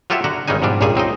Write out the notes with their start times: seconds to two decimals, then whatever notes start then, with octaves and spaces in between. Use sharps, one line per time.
0.10 F#3 F4 G4 A4 C#5 E5
0.24 D3 F#4 A#5
0.48 G#1 C#3 G3 G#3 D#4 G#5
0.62 G#2 B2 F3 G3 D4
0.81 C#2 G2 A#2 G3 G#4 G#5
0.95 C#2 C4 D#4 D#5